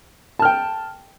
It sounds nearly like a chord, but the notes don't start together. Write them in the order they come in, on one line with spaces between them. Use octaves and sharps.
A5 F6 G5